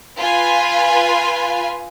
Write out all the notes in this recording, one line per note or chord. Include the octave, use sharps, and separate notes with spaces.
F4 B4 G#5